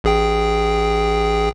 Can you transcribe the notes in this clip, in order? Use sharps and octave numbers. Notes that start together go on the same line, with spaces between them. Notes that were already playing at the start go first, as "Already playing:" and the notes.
A1 G#4 G5